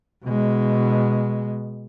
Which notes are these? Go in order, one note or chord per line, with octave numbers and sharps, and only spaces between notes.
B2 G#3